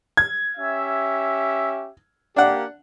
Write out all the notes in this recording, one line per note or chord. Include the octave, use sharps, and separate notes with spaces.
G#6
C#4 G4 E5
A#3 D4 G4 F#5